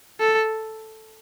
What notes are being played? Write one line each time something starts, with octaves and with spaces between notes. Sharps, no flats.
A4